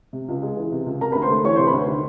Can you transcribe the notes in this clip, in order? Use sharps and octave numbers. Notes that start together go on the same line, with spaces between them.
C3
C#2
G#3
E3
C3
C#2
C3 A#4 A#5
D2 B4 B5
C5 C6
A3
E3 C#5 C#6
C3 C5 C6
B4 B5
D2
D#3